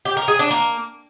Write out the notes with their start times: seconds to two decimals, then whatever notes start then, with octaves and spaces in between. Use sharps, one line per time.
0.05 G4
0.17 A#4
0.28 G#4
0.39 D4
0.51 A#3